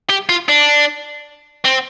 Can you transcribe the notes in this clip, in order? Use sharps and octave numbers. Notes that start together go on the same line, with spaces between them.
G4
F4
D4
C4